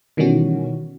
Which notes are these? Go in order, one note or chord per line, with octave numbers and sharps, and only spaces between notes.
B2 D#3 E3 G3 C#4 F#4